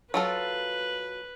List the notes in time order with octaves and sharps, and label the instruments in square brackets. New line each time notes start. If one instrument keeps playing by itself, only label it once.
[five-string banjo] F#3 F4 A4 [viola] B4